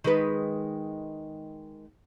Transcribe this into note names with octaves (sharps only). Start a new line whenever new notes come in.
D#3 G#3 B4